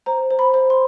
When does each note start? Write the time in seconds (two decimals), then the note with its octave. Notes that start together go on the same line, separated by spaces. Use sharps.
0.06 C5 A#5
0.31 C5
0.39 B5
0.54 C5
0.70 C6